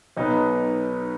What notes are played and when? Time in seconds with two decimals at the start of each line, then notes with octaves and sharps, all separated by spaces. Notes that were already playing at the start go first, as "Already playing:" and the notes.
0.17 B1 B2 B3 D#4